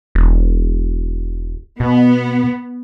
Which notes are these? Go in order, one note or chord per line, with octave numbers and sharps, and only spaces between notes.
E1
B2 B3